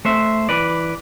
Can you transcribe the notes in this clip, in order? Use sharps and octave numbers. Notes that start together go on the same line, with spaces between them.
A3 C5 E5
E3 B4 D5